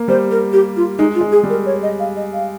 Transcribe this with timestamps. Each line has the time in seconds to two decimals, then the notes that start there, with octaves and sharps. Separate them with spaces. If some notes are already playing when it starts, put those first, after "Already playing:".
Already playing: A#3
0.08 G3 C5
0.31 A#4
0.53 G4
0.77 F4
0.98 G#3 D#4
1.15 F4
1.21 G#3
1.32 G#4
1.43 G3
1.50 A#4
1.66 C#5
1.83 D#5
2.00 F5
2.16 D#5
2.33 F5